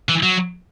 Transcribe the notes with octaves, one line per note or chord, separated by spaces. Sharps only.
E3
F#3